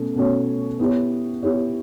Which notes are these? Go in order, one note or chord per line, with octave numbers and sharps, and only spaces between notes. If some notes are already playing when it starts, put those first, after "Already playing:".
Already playing: B2 A3 C#4
B2 A3 C#4 F#4 C#5
B3 E4 G4 C#5
B3 E4 G4 C#5